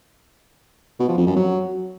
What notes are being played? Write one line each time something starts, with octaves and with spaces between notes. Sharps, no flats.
B2
F3
F2
F#2
F#3